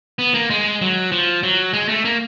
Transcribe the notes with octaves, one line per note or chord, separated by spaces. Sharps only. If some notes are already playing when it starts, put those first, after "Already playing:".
B3
A#3
G#3
F#3
F3
F#3
G#3
A3
A#3